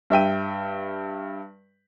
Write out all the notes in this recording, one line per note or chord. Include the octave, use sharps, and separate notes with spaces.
G2 E5 G5 D#7